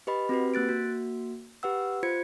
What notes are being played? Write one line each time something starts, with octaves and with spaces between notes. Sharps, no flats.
G4 B4 D#5 B5
C4 F#4 G4 B4
A#3 F#6 A6 D7
A#3 F#4
G4 B4 F#5 E6
F4 C5 G#6 C#7